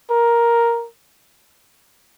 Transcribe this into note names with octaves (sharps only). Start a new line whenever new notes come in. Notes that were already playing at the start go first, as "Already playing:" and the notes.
A#4